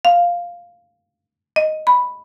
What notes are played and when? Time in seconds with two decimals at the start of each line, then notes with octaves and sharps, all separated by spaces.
0.05 F5
1.56 D#5
1.87 B5